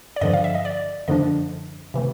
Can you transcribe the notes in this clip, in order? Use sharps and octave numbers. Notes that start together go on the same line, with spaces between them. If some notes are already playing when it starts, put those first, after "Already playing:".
D5
G2 D3 F3 D#5
F5
E5
D#5
D5
F#2 D3 F3 A3 D4 D#5
C3 E3 A3